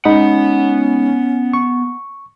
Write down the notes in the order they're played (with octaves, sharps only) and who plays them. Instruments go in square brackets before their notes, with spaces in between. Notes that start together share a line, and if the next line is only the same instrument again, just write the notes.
[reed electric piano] G#3 D#4 B5 [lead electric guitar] B3 F#5 [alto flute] C#4
[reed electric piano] C#6